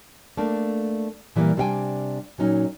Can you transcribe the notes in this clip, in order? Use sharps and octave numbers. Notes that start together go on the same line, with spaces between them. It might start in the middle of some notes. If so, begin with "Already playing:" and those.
A3 A#3 D4
A#2 E3 G3 G#3 A#3
C3 G3 D4 F5 G5 G#5
A#2 F#3 C#4 D#4